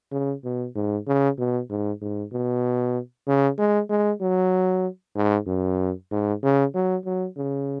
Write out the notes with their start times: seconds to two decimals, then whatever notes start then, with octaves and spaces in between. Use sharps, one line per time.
0.11 C#3
0.44 B2
0.75 G#2
1.07 C#3
1.38 B2
1.70 G#2
2.01 G#2
2.32 B2
3.27 C#3
3.58 G#3
3.90 G#3
4.21 F#3
5.16 G#2
5.47 F#2
6.11 G#2
6.43 C#3
6.74 F#3
7.05 F#3
7.37 C#3